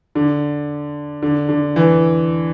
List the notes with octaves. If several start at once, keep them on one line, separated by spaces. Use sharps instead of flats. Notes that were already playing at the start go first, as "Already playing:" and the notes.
D3
D3
D3
E3